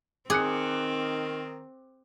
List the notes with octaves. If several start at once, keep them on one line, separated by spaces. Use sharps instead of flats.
D#3 C4 G#4 A#4 D6 F#6 C#7